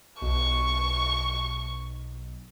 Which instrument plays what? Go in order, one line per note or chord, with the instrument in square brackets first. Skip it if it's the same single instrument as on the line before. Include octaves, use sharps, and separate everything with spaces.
[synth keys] B1 [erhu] C#6